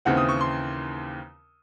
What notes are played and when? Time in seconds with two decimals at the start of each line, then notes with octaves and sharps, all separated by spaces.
0.05 D#2 C#3 E3 C4 F#5
0.17 D#6
0.29 C#6
0.41 C6